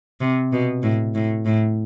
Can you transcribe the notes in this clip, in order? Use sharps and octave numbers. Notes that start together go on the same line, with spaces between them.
C3
B2
A2
A2
A2